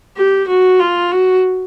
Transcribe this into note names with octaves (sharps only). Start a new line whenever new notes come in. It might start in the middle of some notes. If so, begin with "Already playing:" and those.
G4
F#4
F4
F#4